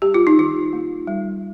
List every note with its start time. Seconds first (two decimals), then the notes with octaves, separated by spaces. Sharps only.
0.02 G3 G4
0.14 F4
0.27 D#4
0.38 D#3 F4
0.73 A#3
1.07 G3